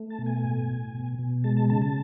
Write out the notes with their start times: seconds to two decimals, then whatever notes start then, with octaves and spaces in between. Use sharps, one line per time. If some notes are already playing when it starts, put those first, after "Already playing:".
Already playing: A3
0.10 A5
0.19 B2
0.26 G#5
0.44 A2
0.69 A2
0.94 B2
1.19 B2
1.44 G#3 A5
1.57 A5
1.70 C#3 A5
1.82 A5